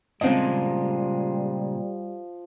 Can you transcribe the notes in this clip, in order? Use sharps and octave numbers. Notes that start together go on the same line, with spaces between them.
A#2 C#3 F3 G3 G#3 C4 D#5